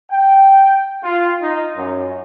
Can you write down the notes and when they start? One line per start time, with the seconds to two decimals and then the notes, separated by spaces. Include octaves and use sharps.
0.11 G5
1.04 F4
1.42 D#4
1.77 F#2